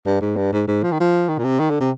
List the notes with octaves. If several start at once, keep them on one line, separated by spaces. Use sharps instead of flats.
G2
G#2
G2
G#2
G#2
F3
D#3
F3
D#3
A#2
C3
D#3
D3
C3